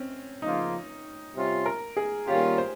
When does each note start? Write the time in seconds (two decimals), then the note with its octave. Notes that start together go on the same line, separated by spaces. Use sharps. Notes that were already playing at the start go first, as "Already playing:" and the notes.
Already playing: C4 C#4
0.42 C#3 F3 A#3 D#4 F4
1.35 C3 G3 C#4 F4
1.66 A#4
1.97 G#4
2.27 D#3 G3 A#3 C#4 F4 G4
2.58 C5